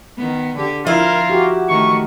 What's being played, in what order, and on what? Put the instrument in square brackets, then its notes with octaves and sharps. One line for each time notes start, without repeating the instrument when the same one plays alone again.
[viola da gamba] D#3 B3
D3 G4
[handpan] F3 [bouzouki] E4 [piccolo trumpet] F4 [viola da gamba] A#4
[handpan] F#4 G4
[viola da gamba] D#3 A3 [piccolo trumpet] C#6